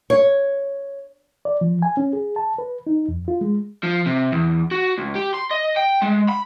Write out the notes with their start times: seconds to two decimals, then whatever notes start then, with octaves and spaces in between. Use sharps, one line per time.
0.10 C#5
1.45 D5
1.61 F3
1.82 G#5
1.97 C#4
2.13 G#4
2.36 A5
2.58 B4
2.87 D#4
3.08 F2
3.28 F4
3.41 G#3
3.83 F3
4.06 C3
4.32 E2
4.71 F#4
4.98 C#2
5.16 G4
5.35 C6
5.51 D#5
5.77 G5
6.03 G#3
6.29 B5